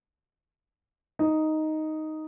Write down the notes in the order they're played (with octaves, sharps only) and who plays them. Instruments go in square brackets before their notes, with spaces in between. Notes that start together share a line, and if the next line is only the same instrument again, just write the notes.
[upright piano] D#4